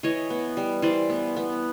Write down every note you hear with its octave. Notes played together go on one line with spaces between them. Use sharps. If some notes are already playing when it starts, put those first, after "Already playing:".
E3 C#5 D#5
B3
G3
E3 C5 D5
B3
B3